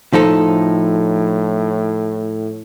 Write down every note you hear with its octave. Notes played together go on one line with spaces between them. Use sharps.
A2 F3 D#4 A4